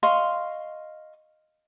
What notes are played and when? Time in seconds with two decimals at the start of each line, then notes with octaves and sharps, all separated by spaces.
0.03 D#5 F5 C6 C#6